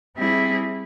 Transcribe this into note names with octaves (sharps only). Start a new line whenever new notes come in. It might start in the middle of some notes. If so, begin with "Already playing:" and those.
G3 C4 E4 G#4